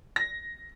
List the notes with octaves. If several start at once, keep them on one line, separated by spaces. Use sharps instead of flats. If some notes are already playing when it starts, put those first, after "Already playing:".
A#6